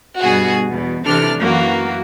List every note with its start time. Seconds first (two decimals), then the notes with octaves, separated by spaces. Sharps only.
0.19 G2 B2 F#4 G#4
0.67 E2 B2
1.04 C3 E3 D4 A4 F6
1.36 F#2 E3 A#3 F#4